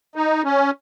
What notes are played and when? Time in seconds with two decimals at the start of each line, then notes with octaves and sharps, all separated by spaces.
0.16 D#4
0.44 C#4